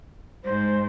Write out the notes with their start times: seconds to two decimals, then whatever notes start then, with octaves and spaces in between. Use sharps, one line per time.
0.44 G#2 C5